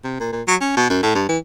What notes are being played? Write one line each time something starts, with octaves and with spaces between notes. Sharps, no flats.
C3
A#2
A#2
F#3
C#4
B2
F#2
A2
G2
E3